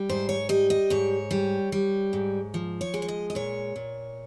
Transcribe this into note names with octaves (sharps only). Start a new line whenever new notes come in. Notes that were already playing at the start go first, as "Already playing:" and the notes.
Already playing: G3
G#2 C5
C#5
G3 D#5
D#5
G#2 C#5
G3
G3
G#2
F3
C#5
G#3
C#5
D#5
D#5
A#2 C#5
A#2